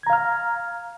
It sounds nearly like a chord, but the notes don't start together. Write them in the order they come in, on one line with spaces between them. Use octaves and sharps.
G#6 A#5 F5 F6